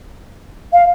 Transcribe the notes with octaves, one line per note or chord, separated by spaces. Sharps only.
F5